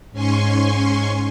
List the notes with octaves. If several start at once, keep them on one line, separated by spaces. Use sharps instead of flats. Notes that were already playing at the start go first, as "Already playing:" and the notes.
G#2 C#4 G#5 C6 C#6